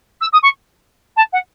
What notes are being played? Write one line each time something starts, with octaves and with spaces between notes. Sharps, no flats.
E6
D#6
C#6
A5
F#5